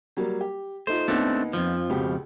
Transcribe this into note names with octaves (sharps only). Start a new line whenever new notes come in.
F#3 G3 A#3
G4
A3 D#4 F4 C5
D#2 A3 B3 C4 D4 D#4
F2 G#2 F3
C#2 B2 G4